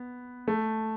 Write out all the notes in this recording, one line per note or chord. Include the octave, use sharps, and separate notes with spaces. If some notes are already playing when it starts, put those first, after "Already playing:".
Already playing: B3
A3